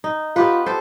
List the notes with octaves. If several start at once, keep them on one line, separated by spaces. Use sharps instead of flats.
D#4
B3 F4 G4 B4
A4 C5